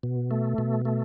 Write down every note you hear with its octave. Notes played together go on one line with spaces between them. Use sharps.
B2
A3
B2
A3